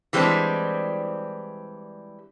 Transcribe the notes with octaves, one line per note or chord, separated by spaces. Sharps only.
E3 G3 G#3 B3 C4 D4